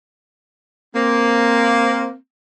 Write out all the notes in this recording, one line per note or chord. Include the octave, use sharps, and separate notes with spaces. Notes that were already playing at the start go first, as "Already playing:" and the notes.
A#3 C4